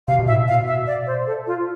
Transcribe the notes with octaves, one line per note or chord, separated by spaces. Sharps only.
C3 F5
B2
A2 E5
B2
F5
E5
D5
C5
A4
F4